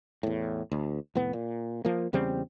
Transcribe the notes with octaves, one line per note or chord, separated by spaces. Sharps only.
E2 A2
D2
F1 A2 B3
A#2
F3 A#3
E2 C#3 G3 C4